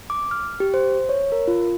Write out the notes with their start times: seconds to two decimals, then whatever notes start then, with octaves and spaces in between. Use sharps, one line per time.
0.10 D6
0.31 F6
0.60 G4
0.74 C5
1.09 C#5
1.32 A#4
1.48 F4